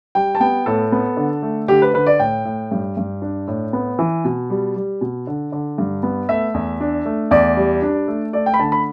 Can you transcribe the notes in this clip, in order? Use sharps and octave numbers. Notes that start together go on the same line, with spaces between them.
G3 G5
A5
B3 G5
A2 A4
B3
D3
A3
D3 G4
B4
D3 B4
D5
A2 G5
A2
G2
G2
D4
A2
B3
E3
B2
G3
G3
B2
D3
D3
G2
B3
A3 E5
E2
D4
A3
E2 D5
G3
D4
A3
A3 D5
G5
B5
D3 A5
B5